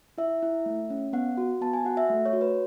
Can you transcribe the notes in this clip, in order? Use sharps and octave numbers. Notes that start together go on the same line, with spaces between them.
E4 E5
E4
A3
C#4
B3 F#5
F#4
B3 A5
G#5
F#4 F#5
E5
A3
C#5
F#4
B4